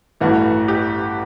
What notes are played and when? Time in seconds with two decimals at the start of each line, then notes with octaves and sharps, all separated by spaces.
0.21 A1 G2 E3 A3 F#4
0.68 G4